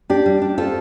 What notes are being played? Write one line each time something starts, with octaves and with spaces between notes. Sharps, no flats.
D4 G4
G3
D4
C4 F4 A4